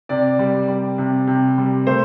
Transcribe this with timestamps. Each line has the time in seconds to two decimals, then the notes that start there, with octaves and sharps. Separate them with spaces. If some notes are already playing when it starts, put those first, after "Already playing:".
0.09 C3 D5
0.39 G3
0.68 G3
0.98 C3
1.27 C3
1.58 G3
1.87 A3 C5